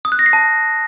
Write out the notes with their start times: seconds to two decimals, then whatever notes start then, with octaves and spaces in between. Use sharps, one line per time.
0.05 D#6
0.12 F#6
0.19 A#6
0.26 C7
0.33 A5